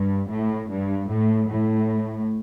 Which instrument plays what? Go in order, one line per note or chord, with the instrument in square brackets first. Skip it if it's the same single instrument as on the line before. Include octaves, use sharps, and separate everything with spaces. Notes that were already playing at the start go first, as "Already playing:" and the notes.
Already playing: [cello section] G2
A2
G2
A2
A2